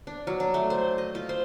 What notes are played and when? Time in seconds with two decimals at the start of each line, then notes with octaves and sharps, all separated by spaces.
0.07 D4
0.27 F#3
0.40 D4
0.54 A3
0.70 C5
0.98 D#5
1.15 F4
1.29 C5